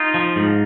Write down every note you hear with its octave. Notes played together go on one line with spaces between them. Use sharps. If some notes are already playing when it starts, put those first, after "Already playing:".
Already playing: D#4 F4
F3
G#2